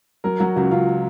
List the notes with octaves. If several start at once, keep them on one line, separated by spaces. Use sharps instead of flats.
F#3 A#4
F#3 F#4
C#2 F#4
C#2 F4